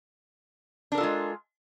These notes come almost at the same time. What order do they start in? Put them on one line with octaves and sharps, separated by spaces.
D4 A#4 A4 F4 G#3